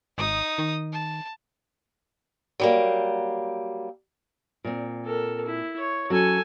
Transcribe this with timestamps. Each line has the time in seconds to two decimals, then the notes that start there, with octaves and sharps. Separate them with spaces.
0.18 G#1 D#4 D#6
0.58 D#3
0.92 A5
2.60 F#3 G3 A#3
4.64 A#2 C4
5.06 A4 A#4
5.46 E4
5.78 C#5
6.10 F#3 C#4 A4 G#5